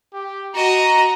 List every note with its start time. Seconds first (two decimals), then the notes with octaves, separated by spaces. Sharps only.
0.14 G4
0.55 F#4 D#5 A#5